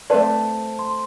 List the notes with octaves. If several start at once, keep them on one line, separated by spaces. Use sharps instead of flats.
A3 C4 F4 B4 D5 A5
C6